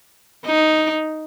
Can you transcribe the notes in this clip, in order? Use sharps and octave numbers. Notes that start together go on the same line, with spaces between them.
D#4